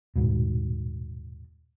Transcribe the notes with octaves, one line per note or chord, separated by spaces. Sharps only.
D#1 G#1 G#2 B2